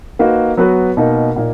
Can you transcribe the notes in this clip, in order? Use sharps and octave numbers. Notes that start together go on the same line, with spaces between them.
A#3 D#4 F#4 B4
F#3 B3 F#4 B4
B2 A#3 D#4 A#4
A#2 A#3 D#4